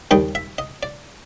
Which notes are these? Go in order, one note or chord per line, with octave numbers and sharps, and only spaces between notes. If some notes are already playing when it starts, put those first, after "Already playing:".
D#2 D#3 G3 D#5
E5
D#5
D5